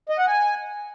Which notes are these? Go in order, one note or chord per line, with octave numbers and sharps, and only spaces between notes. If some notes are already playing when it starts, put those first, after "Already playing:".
D#5
F#5
G#5